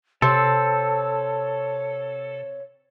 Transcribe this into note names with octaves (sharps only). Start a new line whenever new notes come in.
C3 C4 A4 C#5